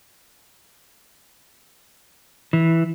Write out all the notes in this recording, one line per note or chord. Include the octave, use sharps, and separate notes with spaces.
E3